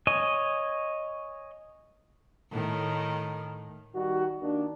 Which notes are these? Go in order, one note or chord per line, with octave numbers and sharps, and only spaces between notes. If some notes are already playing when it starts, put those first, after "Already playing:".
C#5 D#5 G#5
A2 D#3
D#3 G3 F#4
D#3 A#3 D4